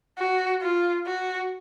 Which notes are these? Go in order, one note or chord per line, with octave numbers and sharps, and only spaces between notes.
F#4
F4
F#4